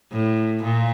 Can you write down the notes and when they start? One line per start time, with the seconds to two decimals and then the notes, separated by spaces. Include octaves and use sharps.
0.12 A2
0.63 A#2